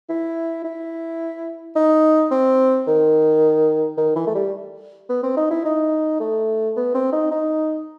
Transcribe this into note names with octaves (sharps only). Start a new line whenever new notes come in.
E4
E4
D#4
C4
D#3
D#3
E3
A3
G3
B3
C4
D#4
E4
D#4
A3
B3
C4
D#4
D#4